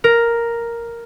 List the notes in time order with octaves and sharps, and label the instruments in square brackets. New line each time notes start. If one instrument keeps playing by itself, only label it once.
[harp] A#4